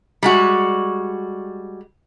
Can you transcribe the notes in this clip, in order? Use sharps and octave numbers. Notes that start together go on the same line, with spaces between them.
G3 G#3 F#4